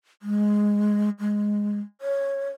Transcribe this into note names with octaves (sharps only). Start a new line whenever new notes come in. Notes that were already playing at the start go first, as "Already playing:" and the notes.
G#3
G#3
C#5